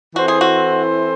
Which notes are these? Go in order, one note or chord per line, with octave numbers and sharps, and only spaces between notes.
E3 C4 E4 F#4 A4 C5
G#4
F#4